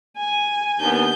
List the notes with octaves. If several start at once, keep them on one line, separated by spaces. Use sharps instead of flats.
G#5
D#2 B3 D4 G6